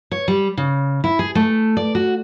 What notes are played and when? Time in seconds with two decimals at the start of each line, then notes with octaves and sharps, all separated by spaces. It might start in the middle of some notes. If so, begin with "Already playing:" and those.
0.11 C#5
0.28 G3
0.57 C#3
1.04 E4
1.19 G#4
1.35 A3
1.77 D5
1.95 F#4